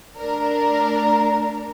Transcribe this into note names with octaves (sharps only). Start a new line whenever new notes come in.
A3 D4 A#4